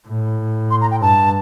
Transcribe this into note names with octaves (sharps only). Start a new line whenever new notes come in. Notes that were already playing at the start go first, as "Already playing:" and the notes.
A2
C6
A#5
G5
G2 A5